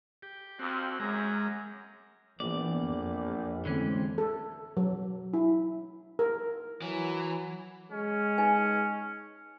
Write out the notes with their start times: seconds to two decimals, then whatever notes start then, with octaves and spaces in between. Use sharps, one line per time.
0.22 G4
0.59 F2 C4 F#4
1.00 F#2 G#3 A#5
2.40 A#1 E3 B3 D5
2.85 F2
3.65 D3 E3 G#3 A3 C4 C#4
4.18 A4
4.77 F#3
5.34 E4
6.19 A#4
6.82 E3 F#3
7.92 G#3 C#4
8.38 D#4 B4 G#5